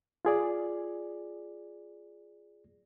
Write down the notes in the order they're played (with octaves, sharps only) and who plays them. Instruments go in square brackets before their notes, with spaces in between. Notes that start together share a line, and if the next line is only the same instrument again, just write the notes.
[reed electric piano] F4 G#4 D5